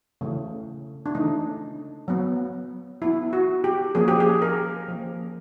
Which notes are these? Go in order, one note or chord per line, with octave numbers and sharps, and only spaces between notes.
C#3 E3 A3 C#4
D4
C#3 E3 A3 C#4 D#4
F#3 B3
F#3 B3 E4
F#4
G4
F3 A#3 C#4 G#4
G4
G#4
A#4
F3 A#3 C#4